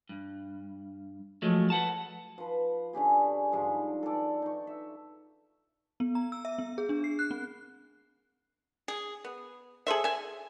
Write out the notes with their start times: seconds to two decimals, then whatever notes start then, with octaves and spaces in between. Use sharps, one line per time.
0.09 G2
1.42 F3 F#3 G#3 A3
1.70 B4 F#5 A5
2.38 F3 B4
2.93 D3 C#4 G4 G#4
3.52 G#2 F3 G3 G#3
4.03 A4 D5
4.42 D#4 C#6
4.67 E5
6.00 B3
6.15 A#5
6.32 E6
6.45 E5
6.58 B3
6.78 G#4
6.89 D4
7.04 C7
7.19 F#6
7.31 C4
8.88 G#4
9.25 B3
9.87 G#4 A4 C5 E5
10.04 E5 G#5